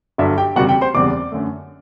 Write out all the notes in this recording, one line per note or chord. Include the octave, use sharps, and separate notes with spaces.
G1 G2 F#3 E5
G4 G5
F#1 E2 C3 G3 F#4 F#5
G4 G5
C5 C6
F#1 E2 C3 G3 D5 D6
F#2 D3 A3